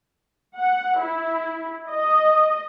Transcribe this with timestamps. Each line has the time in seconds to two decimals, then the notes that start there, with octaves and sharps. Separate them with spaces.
0.58 F#5
1.00 E4
1.90 D#5